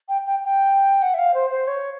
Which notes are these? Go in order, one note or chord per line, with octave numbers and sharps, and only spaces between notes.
G5
G5
G5
F#5
E5
F5
C5
C5
C#5